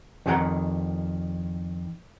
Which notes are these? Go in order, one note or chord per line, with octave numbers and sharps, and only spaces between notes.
F2 D#3 D#4 G#4 F#5 A#5